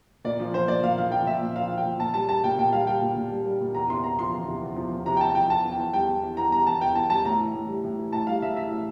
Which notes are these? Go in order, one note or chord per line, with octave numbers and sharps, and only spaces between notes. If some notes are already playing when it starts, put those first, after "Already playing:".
A#2 D5
F3
F3 C5
A#2 D5
A#2 F5
F3 F5
F3 G5
A#2 E5
A#2
F3 F5
F3
G5
A#2
A#2 A5
G3 A5
G3 A5
A#2 G5
A#2 G5
G3 F5
G3 G5
A#2
A#2
G3
G3
A#2
E2 A#5
C3 C6
E2 A#5
F3 C6
E2
C3
E2
F3
E2
C3 A#5
G5
E2 A5
F3 G5
E2 A5
E3
G5
E2
G3 G5
E2
E3
E2 A#5
G3 A#5
E2 A5
E3 G5
E2 A5
G3 A5
A2 A#5
E3
A2
G3
A2
E3
A2 A5
G3 F5
A2 E5
E3 E5
A2